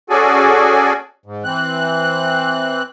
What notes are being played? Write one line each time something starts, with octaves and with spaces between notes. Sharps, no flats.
C#4 F#4 G#4 A4 D5 G#5
G#2
E3 C4 F#6